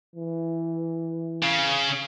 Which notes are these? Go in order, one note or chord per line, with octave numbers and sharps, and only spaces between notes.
E3
C#3